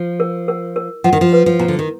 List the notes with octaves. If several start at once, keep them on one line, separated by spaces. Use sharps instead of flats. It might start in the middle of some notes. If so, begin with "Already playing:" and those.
Already playing: F3
A#4
A#4
A#4
F3 F#5
D#3
F3
B4
F3
B2 A#5
D3
D#3